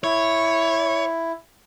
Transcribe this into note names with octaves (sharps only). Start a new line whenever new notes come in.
E4 C#5